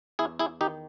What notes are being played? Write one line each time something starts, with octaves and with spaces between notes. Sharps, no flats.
E2 E4 G#4
E4 G#4
D#3 D#4 G4